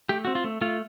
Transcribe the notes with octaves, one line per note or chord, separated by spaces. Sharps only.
A3 G4
C4 F#4
F4
A3
A3 F4